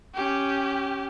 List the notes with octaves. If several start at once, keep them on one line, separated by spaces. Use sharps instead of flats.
C#4 G4